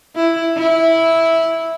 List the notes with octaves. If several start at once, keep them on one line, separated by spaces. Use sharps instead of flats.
E4
E4